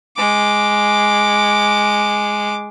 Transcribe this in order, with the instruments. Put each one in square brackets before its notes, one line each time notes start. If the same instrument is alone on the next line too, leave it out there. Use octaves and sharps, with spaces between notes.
[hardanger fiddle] G#3 D6